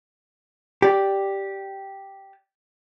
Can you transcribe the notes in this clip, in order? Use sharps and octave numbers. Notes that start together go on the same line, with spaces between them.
G4 D5